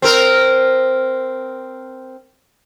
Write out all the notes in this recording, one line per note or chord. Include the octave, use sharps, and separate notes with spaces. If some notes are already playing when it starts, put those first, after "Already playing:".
C4 A#4